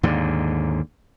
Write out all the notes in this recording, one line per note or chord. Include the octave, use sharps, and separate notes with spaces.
D#2 G#2 D3